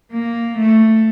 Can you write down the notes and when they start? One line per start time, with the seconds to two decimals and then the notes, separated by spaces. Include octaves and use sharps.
0.12 A#3
0.58 A3